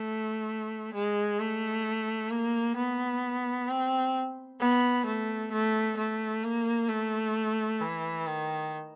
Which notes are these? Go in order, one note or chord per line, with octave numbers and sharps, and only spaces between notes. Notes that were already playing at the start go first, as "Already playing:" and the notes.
Already playing: A3
G#3
A3
A#3
B3
C4
B3
A3
A3
A3
A#3
A3
E3
D#3